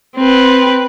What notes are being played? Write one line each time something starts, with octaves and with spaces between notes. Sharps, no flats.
C4 B4